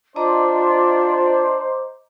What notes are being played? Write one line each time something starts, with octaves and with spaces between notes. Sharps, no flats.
D4 F4 C5 D#5 A#5 D6